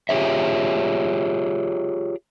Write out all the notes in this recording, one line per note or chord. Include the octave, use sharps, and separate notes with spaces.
F4 G4 G#4 C#5 E5